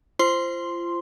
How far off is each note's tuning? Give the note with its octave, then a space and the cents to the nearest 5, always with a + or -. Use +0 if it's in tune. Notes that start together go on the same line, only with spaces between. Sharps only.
F4 -30 C5 +0 C6 +0